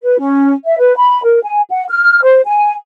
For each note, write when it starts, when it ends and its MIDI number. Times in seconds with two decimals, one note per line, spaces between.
0.03 0.18 71
0.19 0.53 61
0.65 0.77 76
0.78 0.96 71
0.96 1.21 83
1.24 1.39 70
1.44 1.61 80
1.71 1.84 78
1.89 2.21 89
2.22 2.41 72
2.46 2.72 80